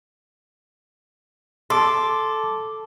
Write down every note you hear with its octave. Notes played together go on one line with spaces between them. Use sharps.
A4 C6 D6